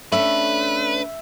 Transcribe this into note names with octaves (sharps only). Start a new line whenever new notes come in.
A3 C#4 D4 B4 E5